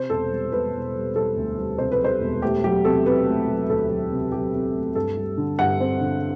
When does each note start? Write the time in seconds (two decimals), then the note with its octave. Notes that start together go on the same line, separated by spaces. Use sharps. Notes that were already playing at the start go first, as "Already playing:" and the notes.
Already playing: C3 C5
0.10 E1 A4
0.31 G3
0.52 E1 B4
0.73 E1
0.95 G3
1.15 G3 A4
1.37 D2
1.58 G3
1.78 C3 C5
1.92 B4
2.00 G3 C5
2.21 E1
2.42 A3 G4
2.64 F#3 G4
2.84 C3 A4
3.05 C3 B4
3.27 A3
3.48 F#3
3.69 D2 A4
3.90 F#3
4.11 C3
4.32 F#3 G4
4.54 C3
4.75 A3
4.95 G2 A4
5.17 G3
5.37 D3
5.59 G2 F#5
5.81 C4
6.01 D3